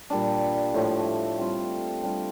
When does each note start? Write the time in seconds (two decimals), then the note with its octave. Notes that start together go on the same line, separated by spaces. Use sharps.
0.10 A#2 G3 D4
0.74 A2 F3 A3
1.39 G3 C4 F4
2.03 G3 D4 F4